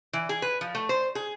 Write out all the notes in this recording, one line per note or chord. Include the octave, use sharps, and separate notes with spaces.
E3
G#4
B4
F3
A3
C5
G#4